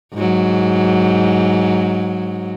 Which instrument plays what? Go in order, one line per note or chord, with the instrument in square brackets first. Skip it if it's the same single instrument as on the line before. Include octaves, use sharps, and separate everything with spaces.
[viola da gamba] G#2 F#3